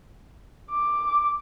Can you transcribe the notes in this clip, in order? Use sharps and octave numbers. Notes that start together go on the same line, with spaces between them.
D6